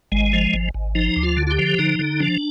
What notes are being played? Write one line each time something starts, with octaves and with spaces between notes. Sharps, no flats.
G#1 G#3
F3
G#1
G#1
F3 D#4
D2
F4
D3
F4
G4
F3
D3 D#4
D3
F3 D4